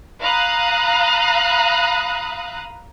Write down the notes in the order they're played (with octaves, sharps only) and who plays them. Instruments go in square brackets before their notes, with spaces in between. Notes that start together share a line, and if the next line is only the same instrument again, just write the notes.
[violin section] F5 A#5 B5 D#6 F#6